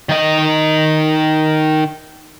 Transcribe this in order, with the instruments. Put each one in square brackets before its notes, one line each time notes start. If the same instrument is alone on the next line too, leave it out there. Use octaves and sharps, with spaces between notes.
[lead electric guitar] D#3 D#5